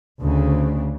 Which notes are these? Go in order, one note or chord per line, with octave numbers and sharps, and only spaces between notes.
D2 C#3